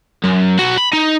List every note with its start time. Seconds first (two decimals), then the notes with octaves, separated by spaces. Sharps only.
0.24 F#2
0.59 B1 F#4
0.77 B5
0.93 D#4